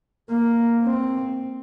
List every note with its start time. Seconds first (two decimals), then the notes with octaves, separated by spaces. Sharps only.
0.30 A#3
0.82 C4